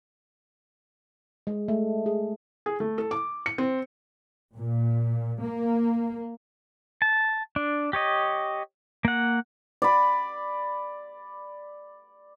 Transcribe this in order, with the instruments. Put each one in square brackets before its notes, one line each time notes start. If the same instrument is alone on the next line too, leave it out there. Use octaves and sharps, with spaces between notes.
[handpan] G#3
A3
G#4
[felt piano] G#4
A3
A4
D6
C#7
C4
[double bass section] A#2
A#3
[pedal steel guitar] A5
D4
G4 C#5 D#5
A#3 F#5
[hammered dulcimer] D5 B5